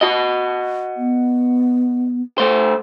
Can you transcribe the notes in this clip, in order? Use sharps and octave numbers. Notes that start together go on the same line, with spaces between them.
F#4 D#5
B3
A3 C5